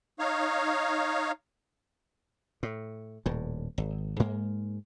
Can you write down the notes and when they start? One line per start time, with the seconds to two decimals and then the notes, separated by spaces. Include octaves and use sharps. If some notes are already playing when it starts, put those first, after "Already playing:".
0.19 D#4 C#5 F5
2.63 A2
3.26 D#1 A2
3.78 G#1
4.20 G#2 G#3 A#3